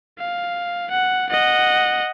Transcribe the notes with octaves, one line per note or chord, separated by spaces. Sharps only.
F5
F#5
D#5 F#5